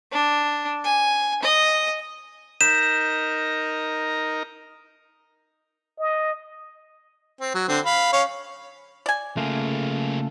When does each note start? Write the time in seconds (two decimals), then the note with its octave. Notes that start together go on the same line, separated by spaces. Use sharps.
0.12 D4
0.84 G#5
1.43 D#5
2.61 D#4 A#4 D#5 G6 B6 E7
5.99 D#5
7.41 C4
7.55 F#3
7.68 D3 C4
7.86 F5 B5
8.13 C#4 C#5 F5
9.06 D5 G#5
9.37 C#3 A3 A#3 F4 G#4